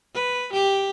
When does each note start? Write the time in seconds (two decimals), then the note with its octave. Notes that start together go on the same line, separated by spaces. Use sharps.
0.15 B4
0.54 G4